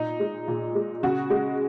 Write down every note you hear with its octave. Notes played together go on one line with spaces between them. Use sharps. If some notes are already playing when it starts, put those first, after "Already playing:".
Already playing: A#2 D#4
G#3
A#2
G#3
C#3 F#4
G#3